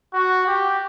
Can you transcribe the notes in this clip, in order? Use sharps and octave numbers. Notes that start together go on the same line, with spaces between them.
F#4
G4